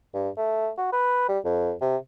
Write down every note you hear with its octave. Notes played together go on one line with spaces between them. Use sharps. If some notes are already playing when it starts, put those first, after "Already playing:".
G2
A3
F#4
B4
G3
F2
C3